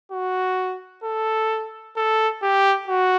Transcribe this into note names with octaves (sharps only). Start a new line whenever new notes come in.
F#4
A4
A4
G4
F#4